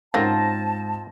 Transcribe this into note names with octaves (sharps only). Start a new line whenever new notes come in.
G#2 C#3 A#3 C4 F4 F#4 A5 A#6